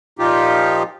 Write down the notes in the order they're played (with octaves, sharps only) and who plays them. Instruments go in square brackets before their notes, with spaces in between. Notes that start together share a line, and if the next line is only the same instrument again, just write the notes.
[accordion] A#2 F3 D#4 F4 G4